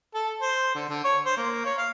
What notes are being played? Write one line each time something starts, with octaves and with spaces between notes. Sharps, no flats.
A4
C5
D3
D3
C#5
C5
A#3
C#5
F5